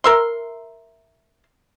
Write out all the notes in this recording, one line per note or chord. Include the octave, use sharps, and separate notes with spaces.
A#4 E5 C6